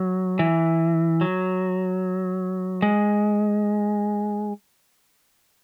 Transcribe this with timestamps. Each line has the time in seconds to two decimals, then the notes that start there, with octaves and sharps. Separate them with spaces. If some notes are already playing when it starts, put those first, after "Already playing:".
Already playing: F#3
0.39 E3
1.21 F#3
2.82 G#3